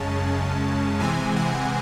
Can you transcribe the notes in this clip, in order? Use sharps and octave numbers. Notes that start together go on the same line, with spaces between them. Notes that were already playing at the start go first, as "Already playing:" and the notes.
Already playing: F#2 C#3 G#3 C#4 A5
C3 E3 G#3 C4 G#5
F#5